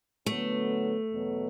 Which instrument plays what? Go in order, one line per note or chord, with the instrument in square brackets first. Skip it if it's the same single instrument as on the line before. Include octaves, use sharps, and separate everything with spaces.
[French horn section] D3 F#3 B3 [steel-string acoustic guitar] A3
[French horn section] E2 B2 F#3 B3